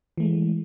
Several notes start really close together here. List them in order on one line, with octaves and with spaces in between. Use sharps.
E3 A3 G#3